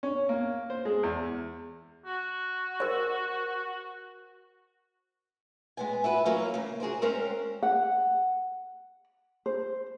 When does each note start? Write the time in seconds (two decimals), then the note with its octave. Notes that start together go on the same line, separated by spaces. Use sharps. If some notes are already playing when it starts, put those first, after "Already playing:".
0.03 C#4
0.29 A#3
0.70 C5
0.85 G#3
1.03 E2
2.06 F#4
2.80 A#4 C5
5.77 G#3 B3 G#5
6.04 E4 F#4 B4
6.26 E3 F#3 A#3 C#4
6.54 C#3 A#3
6.80 F#4 G#4 A#4 C5
7.02 G#3 C4 C#4 A#4 C5
7.63 F#5
9.46 C5